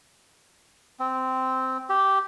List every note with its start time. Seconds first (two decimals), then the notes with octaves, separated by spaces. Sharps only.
1.00 C4
1.89 G4